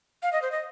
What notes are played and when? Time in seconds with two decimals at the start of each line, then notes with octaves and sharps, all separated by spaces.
0.23 F5
0.33 D#5
0.42 C5
0.52 D#5